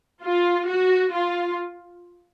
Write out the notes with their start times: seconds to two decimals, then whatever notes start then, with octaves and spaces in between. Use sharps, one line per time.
0.25 F4
0.69 F#4
1.13 F4